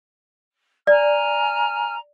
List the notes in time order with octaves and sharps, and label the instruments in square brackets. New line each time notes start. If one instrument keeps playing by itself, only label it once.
[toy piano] D5 [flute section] G#5 A#5 F6